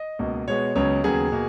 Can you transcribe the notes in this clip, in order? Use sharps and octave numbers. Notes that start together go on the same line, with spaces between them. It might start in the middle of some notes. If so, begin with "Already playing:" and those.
Already playing: D#5
C#2 B2 A#3
B2 G#3 B3 C#5
C#2 C#3 F#3 B3 C#5
D#2 C#3 F#3 B3 G#4
B2 A#3